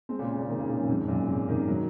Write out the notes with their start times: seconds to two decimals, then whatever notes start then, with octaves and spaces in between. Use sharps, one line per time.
0.09 G#3 C4
0.19 A#2 C#3
0.38 A#2 C#3
0.49 C3 D#3
0.59 A#2 C#3
0.69 A#2 C#3
0.79 F#2
0.88 F2 G#2
1.08 F#2 A#2
1.28 G#2 C3
1.48 C3 D#3
1.68 D#3 F#3